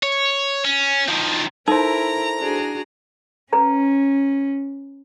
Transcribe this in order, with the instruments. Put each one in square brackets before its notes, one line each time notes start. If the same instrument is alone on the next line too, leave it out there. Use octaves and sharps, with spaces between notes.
[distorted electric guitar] C#5
C#4
D#3 F3
[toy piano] D#4 [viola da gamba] E4 A#4 [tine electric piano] A4 C5 [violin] A#5
[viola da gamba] D4 F#4 G#4
[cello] C#4 [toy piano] B4 A#5